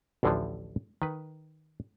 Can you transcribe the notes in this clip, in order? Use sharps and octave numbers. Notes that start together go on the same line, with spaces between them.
A1 D2 A2 D3 E3 F3
D#3 B4